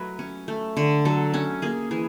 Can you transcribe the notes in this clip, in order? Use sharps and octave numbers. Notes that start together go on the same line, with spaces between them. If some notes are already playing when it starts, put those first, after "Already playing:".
Already playing: F#3 A3 B4 D#5
C#4
A3
D3
F#3 A4
C#4
A#3 G#4
E3 G#4